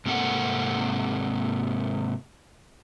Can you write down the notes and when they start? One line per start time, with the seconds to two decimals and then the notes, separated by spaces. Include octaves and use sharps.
0.06 G#2 C3 A#3 C4 A4 F#5